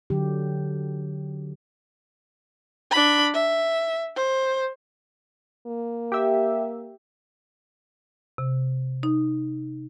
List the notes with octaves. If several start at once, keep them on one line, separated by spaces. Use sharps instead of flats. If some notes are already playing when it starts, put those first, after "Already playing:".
D3 F#3 G4
D4 B5
E5
C5
A#3
G4 E5
C3
D#4